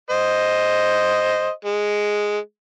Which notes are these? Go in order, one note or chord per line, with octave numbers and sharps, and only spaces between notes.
C5 D#5
G#3